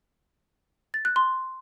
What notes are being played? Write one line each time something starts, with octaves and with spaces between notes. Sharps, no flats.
A6
F#6
C6